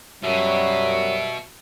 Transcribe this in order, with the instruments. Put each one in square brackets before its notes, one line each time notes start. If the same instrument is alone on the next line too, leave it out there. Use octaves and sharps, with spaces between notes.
[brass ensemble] F#2 G3 [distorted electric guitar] B2 [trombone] F#3 [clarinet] E5